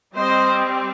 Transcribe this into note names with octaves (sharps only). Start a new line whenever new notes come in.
G3 C4 C5 D#5